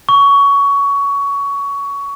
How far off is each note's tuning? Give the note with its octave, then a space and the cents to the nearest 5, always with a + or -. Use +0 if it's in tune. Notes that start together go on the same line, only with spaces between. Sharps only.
C#6 +20